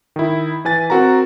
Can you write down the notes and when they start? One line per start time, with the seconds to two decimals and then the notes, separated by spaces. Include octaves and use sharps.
0.16 D#3 E4
0.65 E3 B4 G#5 A6
0.90 C4 F#4 A#4 A#5